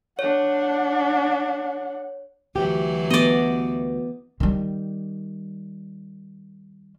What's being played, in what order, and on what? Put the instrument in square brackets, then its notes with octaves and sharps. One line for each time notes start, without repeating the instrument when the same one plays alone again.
[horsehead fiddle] D4 F#5 [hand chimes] C#5
[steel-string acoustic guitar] D2 G4 [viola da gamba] E3 F#3
[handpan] B3 [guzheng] D5 D#5
[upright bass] D#3 G3